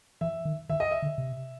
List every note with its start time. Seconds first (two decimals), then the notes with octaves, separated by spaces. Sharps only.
0.21 E3 E5
0.45 D#3
0.69 D#3 E5
0.80 D#5
0.91 E5
1.02 D3
1.18 C3